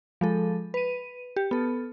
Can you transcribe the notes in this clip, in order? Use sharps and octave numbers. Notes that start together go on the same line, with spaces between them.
F3 G#3 A4
B4 D#7
G4
B3 A4